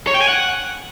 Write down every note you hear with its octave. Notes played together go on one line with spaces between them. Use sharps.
C#5
G5
G#5
F#5